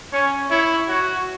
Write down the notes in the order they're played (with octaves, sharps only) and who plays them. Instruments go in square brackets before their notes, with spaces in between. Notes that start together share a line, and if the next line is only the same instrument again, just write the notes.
[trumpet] C#4 [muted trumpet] C#5
[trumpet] E4 [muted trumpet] C#5
[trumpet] F#4 [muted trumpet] C#5